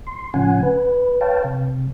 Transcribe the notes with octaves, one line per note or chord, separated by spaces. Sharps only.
C6
A2 C#3 F3 C#4 F#5 G#5
B4
B4 C#5 F5 G5 A5
C3